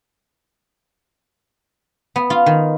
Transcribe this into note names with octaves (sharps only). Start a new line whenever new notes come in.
B3
F4
D#3